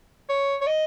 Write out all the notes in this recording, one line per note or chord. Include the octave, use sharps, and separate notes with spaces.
C#5
C#5
D#5